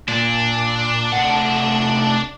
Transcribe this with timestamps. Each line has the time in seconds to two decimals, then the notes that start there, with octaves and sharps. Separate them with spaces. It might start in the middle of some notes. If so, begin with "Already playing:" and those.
0.08 A#2 D4
1.13 C3 A3 F#5